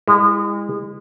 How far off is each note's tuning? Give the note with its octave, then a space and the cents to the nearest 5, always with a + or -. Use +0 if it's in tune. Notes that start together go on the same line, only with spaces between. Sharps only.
G#3 -35 E4 +0